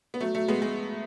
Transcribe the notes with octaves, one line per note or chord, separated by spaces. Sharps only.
B3
F#3 A3
F#3 A3
G#3 B3
G#3